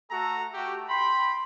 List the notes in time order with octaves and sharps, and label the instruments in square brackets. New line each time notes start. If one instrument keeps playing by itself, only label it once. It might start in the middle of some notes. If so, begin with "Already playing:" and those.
[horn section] A3 F#4 A#5 [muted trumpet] A4
[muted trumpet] A3 [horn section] F#4 G4
[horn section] G5 B5 [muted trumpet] C6